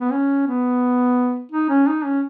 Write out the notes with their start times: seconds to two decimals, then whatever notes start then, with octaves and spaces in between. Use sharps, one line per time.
0.01 B3
0.12 C#4
0.47 B3
1.52 D#4
1.69 C#4
1.87 D#4
2.05 C#4